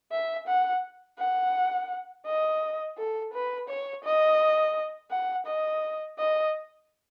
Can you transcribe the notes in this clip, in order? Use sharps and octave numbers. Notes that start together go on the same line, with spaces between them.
E5
F#5
F#5
D#5
A4
B4
C#5
D#5
F#5
D#5
D#5